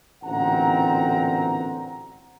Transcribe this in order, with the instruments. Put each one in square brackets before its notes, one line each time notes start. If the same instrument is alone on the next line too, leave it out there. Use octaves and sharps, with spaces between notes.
[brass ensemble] A1 D2 A#2 C4 F#5 A#5